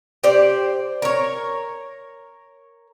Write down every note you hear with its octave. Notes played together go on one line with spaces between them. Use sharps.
G4 C5 D5
A#4 C#5